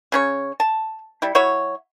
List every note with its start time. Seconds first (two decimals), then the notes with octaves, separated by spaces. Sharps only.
0.12 C#3 C#4 C#5
0.60 A5
1.22 G3 E4
1.35 F#3 E4 F#4 C#5